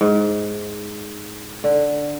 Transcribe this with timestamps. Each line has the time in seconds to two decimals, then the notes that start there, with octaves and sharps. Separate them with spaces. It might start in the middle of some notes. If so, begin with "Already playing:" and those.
0.01 G#2
1.64 D3